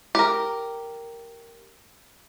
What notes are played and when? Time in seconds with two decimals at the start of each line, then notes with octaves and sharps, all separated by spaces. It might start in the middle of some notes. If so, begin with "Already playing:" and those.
0.15 G4 A#4